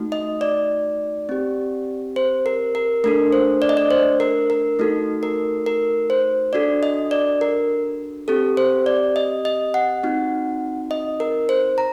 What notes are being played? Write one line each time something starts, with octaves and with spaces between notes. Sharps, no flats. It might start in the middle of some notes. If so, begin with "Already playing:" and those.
Already playing: A3 D#4 F#4
D#5
D5
C4 G4
C5
A#4
A#4
A3 D4 A4 A#4
C5
D5
D#5
D5
C5
A#4
A#4
A3 D#4 F#4 A4
A#4
A#4
C5
D4 F#4 A4 D5
D#5
D5
A#4
C4 G4 A4
C5
D5
D#5
D#5
F#5
C4 D#4 F#4
D#5
A#4
C5
A#5